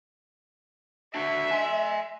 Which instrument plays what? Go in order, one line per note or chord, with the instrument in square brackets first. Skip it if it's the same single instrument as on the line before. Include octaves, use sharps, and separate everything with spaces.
[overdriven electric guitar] D4 F#4 [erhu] E5
[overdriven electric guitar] G#5 C6